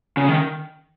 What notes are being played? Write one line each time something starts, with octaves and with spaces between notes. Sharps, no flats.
C#3
D#3